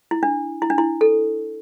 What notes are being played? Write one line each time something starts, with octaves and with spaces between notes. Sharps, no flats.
E4
D4
E4
D4
E4
A4